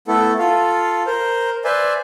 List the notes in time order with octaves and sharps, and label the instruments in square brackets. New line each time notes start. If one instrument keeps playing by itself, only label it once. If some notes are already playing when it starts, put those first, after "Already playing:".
[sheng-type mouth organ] A3 B3 E4 A4
F4 A4 F5
A#4 C5
B4 C5 D5 E5 G#5